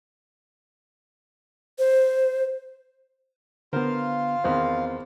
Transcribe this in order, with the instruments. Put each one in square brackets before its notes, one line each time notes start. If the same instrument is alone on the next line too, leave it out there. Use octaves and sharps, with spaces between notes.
[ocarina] C5
[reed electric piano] D3 B3 [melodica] F4 F5 [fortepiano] A#4 C5
[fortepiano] E2 D#3 [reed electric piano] C4 C5